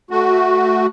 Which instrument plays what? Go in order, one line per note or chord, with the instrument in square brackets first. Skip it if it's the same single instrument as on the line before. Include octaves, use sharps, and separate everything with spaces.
[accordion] A3 F#4